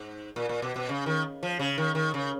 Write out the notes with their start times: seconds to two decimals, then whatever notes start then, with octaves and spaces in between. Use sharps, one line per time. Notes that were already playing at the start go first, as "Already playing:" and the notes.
Already playing: G#2
0.36 A#2
0.49 A#2
0.62 B2
0.76 B2
0.89 C#3
1.06 D#3
1.43 F3
1.59 C#3
1.78 D#3
1.95 D#3
2.14 C#3